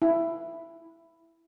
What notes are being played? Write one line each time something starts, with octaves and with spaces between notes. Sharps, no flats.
E4